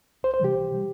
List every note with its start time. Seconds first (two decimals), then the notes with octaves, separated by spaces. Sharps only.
0.23 C2 C5
0.34 C5
0.40 C3 E3 G3 G4
0.55 C2
0.71 C3 E3 G3